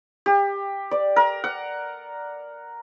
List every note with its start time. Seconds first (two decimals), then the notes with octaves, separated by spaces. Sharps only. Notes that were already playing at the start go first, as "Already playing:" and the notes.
0.26 G4
0.91 D5
1.16 A#4
1.44 F#5